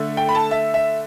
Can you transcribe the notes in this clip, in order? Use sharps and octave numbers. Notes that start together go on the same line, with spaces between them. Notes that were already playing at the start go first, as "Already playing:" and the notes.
Already playing: D3 A3
G5
B5
A5
E5
E5